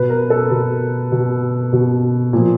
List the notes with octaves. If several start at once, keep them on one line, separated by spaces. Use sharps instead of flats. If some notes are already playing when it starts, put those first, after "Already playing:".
Already playing: B2 B4
A#4
A4
B2 A#4
B2
B2
A#2 F3